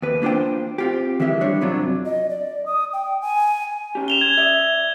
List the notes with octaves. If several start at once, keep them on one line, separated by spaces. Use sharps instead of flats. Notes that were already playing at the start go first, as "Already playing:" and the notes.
D#2 B4
A#3 D4 F4 C5 G5
C4 F4 G4
D#3 E3 G#3 G4 E5
G3 D4 C#5
F#2 C3 F#3 D4 F4
D#5
D5
D#6
G5
G#5
C#4 G4
E7 F7 G7
G#6
D5 E5